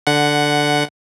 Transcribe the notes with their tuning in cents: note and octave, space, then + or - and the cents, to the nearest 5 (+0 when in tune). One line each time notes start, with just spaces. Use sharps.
D3 +0 F#5 +0